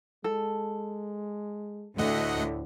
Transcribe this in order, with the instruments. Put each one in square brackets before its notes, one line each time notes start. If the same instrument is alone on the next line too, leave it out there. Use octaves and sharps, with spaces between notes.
[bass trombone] G#3 [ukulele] A4
[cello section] D2 [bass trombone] A2 [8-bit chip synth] A3 D#5 F#5